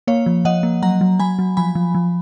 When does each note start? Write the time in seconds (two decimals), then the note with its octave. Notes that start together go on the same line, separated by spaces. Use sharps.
0.07 A#3 C#5 F5
0.26 F3
0.45 F3 D#5 F#5
0.63 A#3
0.83 F#3 F#5 A#5
1.01 F#3
1.20 F#3 G#5 B5
1.39 F#3
1.57 F3 G#5 B5
1.75 F3
1.95 F3